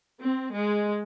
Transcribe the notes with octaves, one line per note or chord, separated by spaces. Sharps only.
C4
G#3